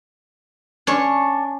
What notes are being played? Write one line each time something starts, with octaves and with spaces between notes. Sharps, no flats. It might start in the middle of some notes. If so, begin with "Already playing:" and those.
C#4 D4 C#5 C#6